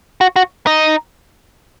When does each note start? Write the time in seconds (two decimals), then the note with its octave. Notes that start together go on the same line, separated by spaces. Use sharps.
0.21 F#4
0.36 F#4
0.67 D#4